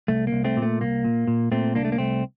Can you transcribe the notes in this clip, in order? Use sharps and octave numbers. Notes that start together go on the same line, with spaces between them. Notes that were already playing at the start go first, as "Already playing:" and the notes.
C2 A3
A#3
C2
A3 C4
A#2
A3
C2 A#3
A#2
A#2
A#2 A3 C4
C2 A#3 D4
A3
A#3
C2 A3 C4